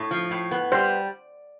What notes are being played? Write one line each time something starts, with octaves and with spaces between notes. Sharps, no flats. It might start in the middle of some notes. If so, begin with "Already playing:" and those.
Already playing: A2
F3
A2
B3
G3 C5